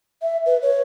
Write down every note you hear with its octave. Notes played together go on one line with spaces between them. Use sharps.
E5
B4
C#5